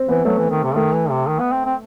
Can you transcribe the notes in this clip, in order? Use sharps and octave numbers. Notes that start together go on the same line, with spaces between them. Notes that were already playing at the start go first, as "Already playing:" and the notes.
Already playing: C4 C5
E3 B3 B4
F#3 A3 A4
E3
D#3
C3
D#3 A3 A4
E3
C3
D#3
B3
C4
C4